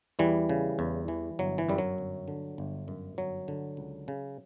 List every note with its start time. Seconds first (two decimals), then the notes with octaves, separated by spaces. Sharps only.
0.19 E2 E3 G3
0.49 C#3
0.79 E2
1.08 E3
1.39 G1 F#3
1.58 E3
1.69 F#2 G3
1.78 F#3
1.98 G1
2.28 D3
2.58 G1
2.88 F#2
3.18 G1 F#3
3.48 D3
3.77 C#2
4.08 C#3